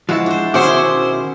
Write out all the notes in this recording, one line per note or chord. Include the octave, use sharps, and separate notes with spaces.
F3 G#3 E4 F#4 A5
D4 C5
B2 D#3 C#4 E4 F#4 G#4 C5 D6